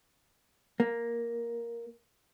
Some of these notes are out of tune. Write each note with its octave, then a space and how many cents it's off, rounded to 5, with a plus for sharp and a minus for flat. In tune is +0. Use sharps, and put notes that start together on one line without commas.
A#3 +5